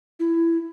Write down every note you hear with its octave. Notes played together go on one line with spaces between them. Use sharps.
E4